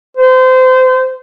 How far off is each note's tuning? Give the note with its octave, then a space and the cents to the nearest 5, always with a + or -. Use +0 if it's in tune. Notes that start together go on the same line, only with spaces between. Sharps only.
C5 -25